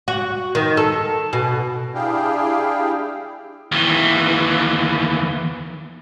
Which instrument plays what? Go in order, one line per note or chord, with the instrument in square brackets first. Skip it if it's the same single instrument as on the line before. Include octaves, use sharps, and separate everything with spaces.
[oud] F#4
D#3
A4
B2
[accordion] D4 E4 G4 G#4 F5 G5
[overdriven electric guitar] D#2 E3